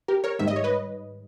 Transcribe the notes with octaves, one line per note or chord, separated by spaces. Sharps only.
G4 A#4
A#4 C#5
G#2 D#3 G3 E5
D#5
C#5
B4 D#5